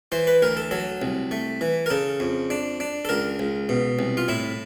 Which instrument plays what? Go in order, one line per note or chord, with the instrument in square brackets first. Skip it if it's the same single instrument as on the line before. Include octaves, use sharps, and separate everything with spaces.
[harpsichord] E3 C5
B4
D2 A#4
A4
F#3 A4
C2
A3
E3
A#4
C#3 A4
F2
D4
D4
A4
C#2 A#4
C#2
B2
C2
F4
A2 E4